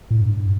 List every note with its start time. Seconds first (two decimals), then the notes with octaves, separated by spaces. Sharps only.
0.11 A2
0.21 G2